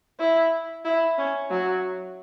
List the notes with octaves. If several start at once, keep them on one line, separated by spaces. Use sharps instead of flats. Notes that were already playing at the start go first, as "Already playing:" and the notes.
E4
E4
C#4
F#3